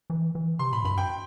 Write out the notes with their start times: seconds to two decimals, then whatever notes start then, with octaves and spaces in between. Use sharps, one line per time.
0.10 E3
0.35 E3
0.59 C3 C6
0.72 A2 B5
0.84 G2 B5
0.98 F#2 G5